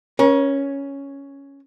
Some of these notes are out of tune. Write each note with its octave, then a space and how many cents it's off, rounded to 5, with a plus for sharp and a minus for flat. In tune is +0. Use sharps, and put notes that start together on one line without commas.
C#4 +0 A#4 +40